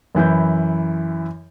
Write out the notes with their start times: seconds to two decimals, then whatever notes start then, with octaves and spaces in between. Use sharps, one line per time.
0.15 F#2 E3 E4 G6